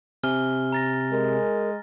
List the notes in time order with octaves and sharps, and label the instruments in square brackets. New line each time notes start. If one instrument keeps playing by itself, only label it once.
[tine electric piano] C3 [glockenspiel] G#5 F6 G7
[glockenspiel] A#5 A6 A#6
[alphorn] G#3 [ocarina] A#4